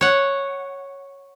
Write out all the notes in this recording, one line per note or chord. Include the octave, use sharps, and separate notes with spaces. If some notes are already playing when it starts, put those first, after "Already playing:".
C#5 F#5